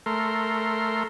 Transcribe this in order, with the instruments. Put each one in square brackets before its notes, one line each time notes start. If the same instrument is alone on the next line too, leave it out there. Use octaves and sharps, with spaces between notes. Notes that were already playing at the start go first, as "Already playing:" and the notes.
[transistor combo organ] A3 A#4 C6